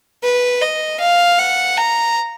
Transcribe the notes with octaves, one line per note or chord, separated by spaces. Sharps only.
B4
D#5
F5
F#5
A#5